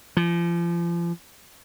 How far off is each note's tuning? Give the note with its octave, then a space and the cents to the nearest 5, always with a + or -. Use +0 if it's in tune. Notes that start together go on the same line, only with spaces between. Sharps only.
F3 -35